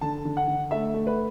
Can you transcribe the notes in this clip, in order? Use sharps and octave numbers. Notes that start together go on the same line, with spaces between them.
D3 A5
D3
F#5
D3
A3 E5
A3
B4